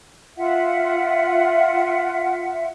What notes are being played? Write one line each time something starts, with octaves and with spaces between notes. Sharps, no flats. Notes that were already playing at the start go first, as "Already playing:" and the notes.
F4 E5 F#5